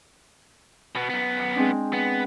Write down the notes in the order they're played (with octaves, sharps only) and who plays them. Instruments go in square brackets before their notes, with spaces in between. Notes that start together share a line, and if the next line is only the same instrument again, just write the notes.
[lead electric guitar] B2 B3
F#2 B3
[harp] G#3 C4 D4
[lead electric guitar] B3